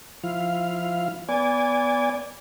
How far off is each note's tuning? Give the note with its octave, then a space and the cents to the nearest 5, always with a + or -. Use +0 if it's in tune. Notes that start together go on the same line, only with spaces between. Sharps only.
F3 -5 E4 +10 F5 +0
B3 +0 D5 -25 G#5 -20